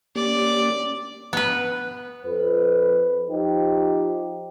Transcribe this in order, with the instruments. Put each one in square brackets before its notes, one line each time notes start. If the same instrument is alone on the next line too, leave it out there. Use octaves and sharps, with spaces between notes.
[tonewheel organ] A#3 C#4 G4 [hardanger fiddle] D5
[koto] B3 B4
[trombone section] F2 B4
F3 D#4 G4